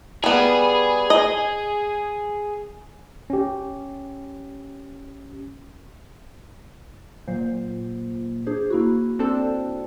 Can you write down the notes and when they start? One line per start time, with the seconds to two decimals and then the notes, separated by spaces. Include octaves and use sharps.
0.24 G3 B3 G#4
1.10 D#5
3.30 C#4 G4
7.28 A#2 F#3 C5
8.46 D4 G#4 C5
8.70 A#3 E4 F#4
9.19 C4 D4 A4